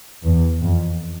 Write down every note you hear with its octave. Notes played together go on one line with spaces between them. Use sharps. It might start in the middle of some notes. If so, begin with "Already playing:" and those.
E2
F2